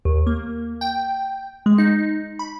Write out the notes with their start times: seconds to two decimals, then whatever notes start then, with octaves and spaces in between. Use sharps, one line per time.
0.05 D#2
0.27 A#3
0.81 G5
1.66 G#3
1.78 D#4
2.39 B5